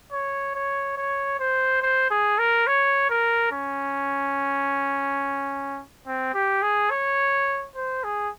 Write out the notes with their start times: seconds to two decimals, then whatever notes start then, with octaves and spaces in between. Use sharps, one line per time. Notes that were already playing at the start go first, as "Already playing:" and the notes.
0.12 C#5
0.55 C#5
0.97 C#5
1.40 C5
1.82 C5
2.11 G#4
2.39 A#4
2.67 C#5
3.10 A#4
3.52 C#4
6.06 C4
6.34 G4
6.62 G#4
6.91 C#5
7.76 C5
8.04 G#4